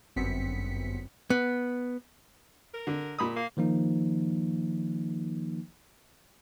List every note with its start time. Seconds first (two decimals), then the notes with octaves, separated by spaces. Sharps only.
0.16 G1 F#2 B3 C4 B6 C#7
1.30 B3
2.74 A#4
2.87 D3
3.18 A#2 B5 D#6
3.36 A#3
3.57 D#3 F3 A#3 D#4